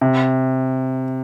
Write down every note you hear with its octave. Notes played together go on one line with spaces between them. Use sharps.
C3